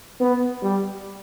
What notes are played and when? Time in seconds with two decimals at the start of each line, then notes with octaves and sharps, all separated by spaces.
0.20 B3
0.63 G3